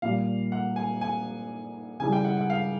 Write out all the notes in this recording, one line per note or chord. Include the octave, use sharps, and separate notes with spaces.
A#2 G3 F5
F#5
G#5
G#5
C#3 E3 G3 G#5
G5
F#5
F#5
F5